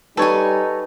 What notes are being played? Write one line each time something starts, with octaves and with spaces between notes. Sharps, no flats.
G3 D#4 A4 B4 C#5 G#5